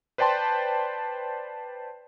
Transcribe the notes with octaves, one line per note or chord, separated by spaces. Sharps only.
B4 C5 D5 G5 A5 C6